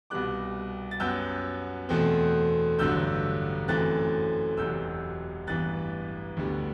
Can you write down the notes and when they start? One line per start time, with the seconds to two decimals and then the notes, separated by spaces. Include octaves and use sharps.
0.10 C2 B2 G3 B3 D6 F#6
0.91 A6
1.00 F#2 F#3 B3 E6 G6
1.89 E2 B2 A3 C4
2.79 A1 G2 D3 F#3 E6 G6
3.68 F#2 E3 A3 C4 F#6 A6
4.57 E1 E2 C3 F#3 E6 G6
5.47 A1 G2 E3 B3 F#6 A6
6.37 D2 D3 G3 B3